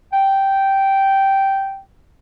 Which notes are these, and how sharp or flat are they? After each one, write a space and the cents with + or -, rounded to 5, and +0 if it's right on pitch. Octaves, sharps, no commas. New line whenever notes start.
G5 -10